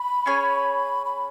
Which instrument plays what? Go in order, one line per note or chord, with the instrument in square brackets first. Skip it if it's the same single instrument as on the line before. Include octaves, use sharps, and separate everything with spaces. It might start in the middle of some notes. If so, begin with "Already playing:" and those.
Already playing: [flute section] B5
[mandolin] C#4 G#4 C#5 G#5
[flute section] B5